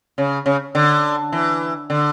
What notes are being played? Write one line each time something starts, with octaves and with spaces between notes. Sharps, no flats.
C#3
C#3
D3
E3
D3